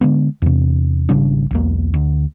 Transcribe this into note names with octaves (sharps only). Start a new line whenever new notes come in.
D3 G#3 B3
E2 C3
G#1 C#3 G3 D4
B1 E2 A#3
D2